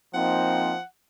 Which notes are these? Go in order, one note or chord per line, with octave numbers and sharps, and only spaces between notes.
F3 A#3 C4 D#4 F#5